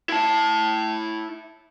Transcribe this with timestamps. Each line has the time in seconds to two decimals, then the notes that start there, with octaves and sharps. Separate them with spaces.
0.09 E4 A5